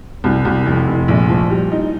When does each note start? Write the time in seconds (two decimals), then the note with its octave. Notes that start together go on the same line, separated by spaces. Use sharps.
0.24 C2
0.45 C2
0.66 F1
0.87 F1
1.08 A#1
1.29 F3
1.50 G3
1.72 D#4